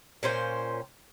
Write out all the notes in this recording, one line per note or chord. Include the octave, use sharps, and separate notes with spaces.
A#2 C#4 C5 G5